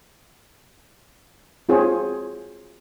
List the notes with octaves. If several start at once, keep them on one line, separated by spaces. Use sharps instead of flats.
C4 F4 F#4 G#4 C5 C#5